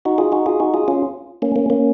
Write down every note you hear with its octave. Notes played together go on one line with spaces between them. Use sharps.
D#4 F#4
F4 G#4
D#4 F#4
F4 G#4
D#4 F#4
F4 G#4
C#4 F4
A#3 C#4
A#3 C#4
A#3 C#4